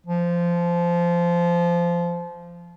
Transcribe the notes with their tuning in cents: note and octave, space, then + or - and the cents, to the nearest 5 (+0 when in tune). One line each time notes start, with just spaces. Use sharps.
F3 -15